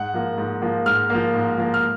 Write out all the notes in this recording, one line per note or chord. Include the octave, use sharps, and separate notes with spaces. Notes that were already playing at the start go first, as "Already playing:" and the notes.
Already playing: G#2 F#5
F3 A#3
G#2
F3 A#3
G#2 F6
F3 A#3
G#2
F3 A#3
F6